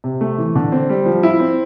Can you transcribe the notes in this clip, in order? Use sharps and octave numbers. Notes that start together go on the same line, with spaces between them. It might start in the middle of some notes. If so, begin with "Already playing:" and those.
C3
A3
E3
D3
C4
G3
F3
E4
C4